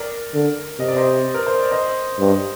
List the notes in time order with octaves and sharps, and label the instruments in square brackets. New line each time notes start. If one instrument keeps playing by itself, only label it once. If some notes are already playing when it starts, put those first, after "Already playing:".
Already playing: [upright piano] A#4 D5
[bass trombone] D3
[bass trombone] C3 [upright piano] D#5
[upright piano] D5
C5 D#5
A#4
C5
D5
C5 D#5
[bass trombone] G2